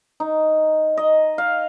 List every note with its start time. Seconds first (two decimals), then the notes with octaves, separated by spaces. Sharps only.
0.20 D#4
0.97 D#5
1.38 F5